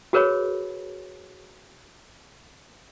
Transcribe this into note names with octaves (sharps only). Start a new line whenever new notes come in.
F#4 G#4 A#4 B4 C#5 B5